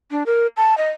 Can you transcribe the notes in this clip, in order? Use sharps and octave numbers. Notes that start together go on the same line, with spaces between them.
D4
A#4
A5
D#5